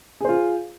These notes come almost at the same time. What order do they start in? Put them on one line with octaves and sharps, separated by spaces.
G#4 C5 F4